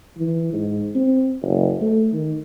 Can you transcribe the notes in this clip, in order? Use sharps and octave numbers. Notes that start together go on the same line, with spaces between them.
E3
G#2
C4
F#1
A3
D#3